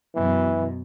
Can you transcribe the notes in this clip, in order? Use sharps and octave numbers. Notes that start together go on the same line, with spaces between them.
F#2 B2 E3